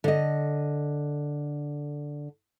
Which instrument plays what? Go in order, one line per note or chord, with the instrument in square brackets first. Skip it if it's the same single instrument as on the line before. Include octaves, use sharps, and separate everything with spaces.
[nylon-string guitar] D3 D#5